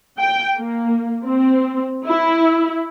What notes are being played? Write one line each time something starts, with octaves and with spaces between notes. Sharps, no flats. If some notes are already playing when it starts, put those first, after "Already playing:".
G5
A#3
C4
E4